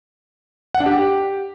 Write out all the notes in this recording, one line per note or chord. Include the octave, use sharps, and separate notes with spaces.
F#5
D4
G4